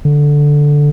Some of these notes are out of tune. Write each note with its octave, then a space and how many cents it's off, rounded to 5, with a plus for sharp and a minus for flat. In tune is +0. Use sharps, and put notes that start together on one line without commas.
D3 -5